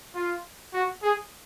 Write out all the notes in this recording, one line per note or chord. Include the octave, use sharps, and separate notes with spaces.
F4
F#4
G#4